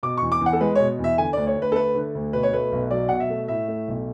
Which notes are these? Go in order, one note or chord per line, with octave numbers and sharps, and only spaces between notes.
B2 D6
E2 C#6
D6
E2
F#5
A4
G#3 B4
B2 C#5
E2
E5
D3 G#5
D2 D5
C#5
D2
B4
A4
A3 B4
D3
D2
B2 B4
C#5
A3 B4
B1
F#3 D5
B2 F#5
E5
A3
A2 E5
A3
B1